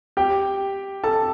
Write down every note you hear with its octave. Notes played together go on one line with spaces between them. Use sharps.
G4 G5
A4 A5